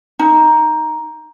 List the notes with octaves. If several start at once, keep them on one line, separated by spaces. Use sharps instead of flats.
D#4